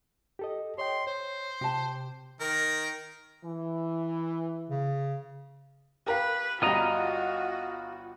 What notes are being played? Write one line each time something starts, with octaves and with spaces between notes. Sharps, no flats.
G4 A4 D#5
C#5 D#5 G5 C6
C5 C#5
C3 G4 A5
D#3 A#4
E3
C#3
G4 A#4 B4 F5
G1 G3 F4 F#4 D#5 A#5